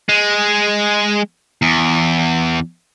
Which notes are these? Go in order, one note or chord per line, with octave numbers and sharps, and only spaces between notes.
G#3
E2